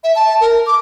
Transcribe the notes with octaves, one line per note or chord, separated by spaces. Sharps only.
E5
A5
A#4
D6